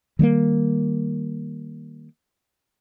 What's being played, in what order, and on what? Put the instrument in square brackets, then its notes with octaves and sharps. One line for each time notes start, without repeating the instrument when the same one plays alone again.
[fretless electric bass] D#3 G3 A3 A#3